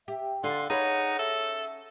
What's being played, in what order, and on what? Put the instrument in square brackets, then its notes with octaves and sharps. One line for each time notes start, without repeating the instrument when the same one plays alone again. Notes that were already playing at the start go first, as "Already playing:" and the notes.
[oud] G4 [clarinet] E5
[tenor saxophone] D3 [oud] F4 [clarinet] C6
[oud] C#4 G#4 B4 [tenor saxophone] D#4 [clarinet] F#5
[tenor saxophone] A4 [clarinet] E5